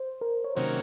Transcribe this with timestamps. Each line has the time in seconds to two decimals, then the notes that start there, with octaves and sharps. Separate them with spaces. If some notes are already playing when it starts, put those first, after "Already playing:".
Already playing: C5
0.21 A#4
0.44 C#5
0.55 C3 D#3 F#3 A#3 C#4 C5